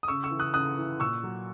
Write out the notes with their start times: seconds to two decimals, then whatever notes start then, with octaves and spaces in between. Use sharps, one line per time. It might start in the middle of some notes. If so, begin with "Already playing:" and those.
0.03 D#6
0.08 C#3 C#6 E6
0.24 C#6 E6
0.31 E3
0.39 D#6 F#6
0.54 C#3 D#6 F#6
0.77 E3
1.00 A#2 C#6 E6
1.23 F#3